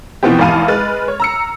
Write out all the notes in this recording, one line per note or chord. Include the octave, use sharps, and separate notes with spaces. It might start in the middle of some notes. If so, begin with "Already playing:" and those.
B2 E3 F3 B3 C4 G4
G#1 E2 A2 F5 A5 D#7
G#3 B4 F6 A6
C#5
A#5 E6 C#7